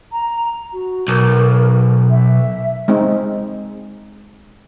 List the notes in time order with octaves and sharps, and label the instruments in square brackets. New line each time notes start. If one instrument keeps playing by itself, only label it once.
[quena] A#5
F#4
[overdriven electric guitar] B1 [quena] A#4
[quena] E5
[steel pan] G#3 C4 D#4